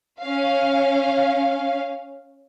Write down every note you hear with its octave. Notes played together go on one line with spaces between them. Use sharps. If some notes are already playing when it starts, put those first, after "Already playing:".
C#4 F5